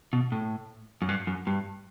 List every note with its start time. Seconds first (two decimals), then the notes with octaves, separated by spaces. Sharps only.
0.13 B2
0.32 A2
1.02 F#2
1.09 G2
1.27 F#2
1.47 G2